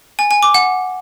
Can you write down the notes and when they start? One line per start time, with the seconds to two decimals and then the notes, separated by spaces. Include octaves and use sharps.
0.19 G#5
0.31 G#5
0.43 D6
0.54 F#5